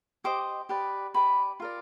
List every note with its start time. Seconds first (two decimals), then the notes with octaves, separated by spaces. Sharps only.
0.24 G4 C5 D#5 D6
0.69 G4 B4 D5
1.14 G4 B4 D5 B5
1.60 F4 A#4 D5